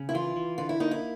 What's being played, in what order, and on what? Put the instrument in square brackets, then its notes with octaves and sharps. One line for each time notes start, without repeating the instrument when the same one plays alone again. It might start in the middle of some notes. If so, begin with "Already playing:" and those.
Already playing: [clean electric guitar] C#3
[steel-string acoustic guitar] E4
[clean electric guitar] E3 [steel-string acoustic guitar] F4
[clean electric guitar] E3
[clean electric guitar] D3 [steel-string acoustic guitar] F4
[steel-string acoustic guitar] E4
[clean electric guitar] A#3 [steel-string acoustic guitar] D#4
[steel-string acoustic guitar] E4